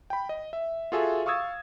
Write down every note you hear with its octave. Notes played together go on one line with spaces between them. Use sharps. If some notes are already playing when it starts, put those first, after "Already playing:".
G5 B5
D#5
E5
F4 F#4 G#4 A4 E5 G#5
F5 C#6 D#6 E6 G#6 A6